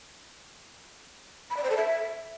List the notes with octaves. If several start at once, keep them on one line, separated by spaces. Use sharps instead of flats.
B5
D5
C5
A4
E5